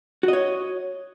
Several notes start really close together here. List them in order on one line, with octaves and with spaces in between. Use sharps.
F#4 D#5 C#5